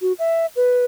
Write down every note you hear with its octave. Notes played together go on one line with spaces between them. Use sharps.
F#4
E5
B4